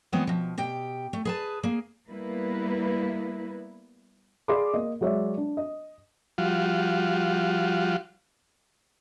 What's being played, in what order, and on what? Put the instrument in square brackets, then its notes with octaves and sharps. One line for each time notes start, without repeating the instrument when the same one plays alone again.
[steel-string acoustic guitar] E3 G#3 B3 C4 F4 C#5
B2 F3
B2 G4 G5
A3
G#4 B4 A5
A#3 G#4
[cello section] G3 A#3 B3 E4 B4
[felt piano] G#4 D5 F5 B5 C6 D6
A#3 D#5
F#3 G#3 C#5 D5 E5
D4
D#5
[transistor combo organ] F3 G3 F4 F#4